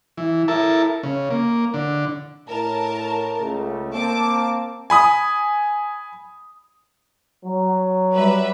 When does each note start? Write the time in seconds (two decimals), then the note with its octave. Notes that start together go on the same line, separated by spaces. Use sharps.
0.17 E3
0.48 E4 A4 A#4 A5
1.03 C#3
1.31 A#3
1.74 D3
2.48 A2 A#4 A5
3.40 C#2 C#3 A3
3.93 A#3 C4 A5 D6
4.90 G#5 B5 D#6
7.45 F#3
8.13 G3 B4 E5